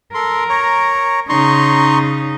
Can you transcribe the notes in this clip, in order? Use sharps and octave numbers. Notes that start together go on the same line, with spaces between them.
A4 A#4 C6
C#5 A#5
C#3 D#4 A#5 C6 C#6